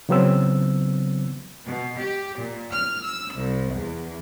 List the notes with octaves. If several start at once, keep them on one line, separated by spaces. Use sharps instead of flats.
C#3 E3 F#3 B3 C4 E6
B2
G4
A#2
F6
E6
C2
E2